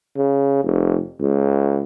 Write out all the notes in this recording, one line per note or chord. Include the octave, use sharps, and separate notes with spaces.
C#3
F1
C#2